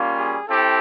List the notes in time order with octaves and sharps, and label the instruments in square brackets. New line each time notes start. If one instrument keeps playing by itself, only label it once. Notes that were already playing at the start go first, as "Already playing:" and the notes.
Already playing: [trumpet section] G3 A#3 C#4 F4
G#4
C4 E4 G4 A4